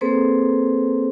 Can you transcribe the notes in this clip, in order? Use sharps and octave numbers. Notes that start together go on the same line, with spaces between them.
A#3 C4 G#4 A4 B4 C5